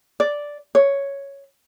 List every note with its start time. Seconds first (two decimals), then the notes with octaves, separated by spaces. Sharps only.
0.20 D5
0.75 C#5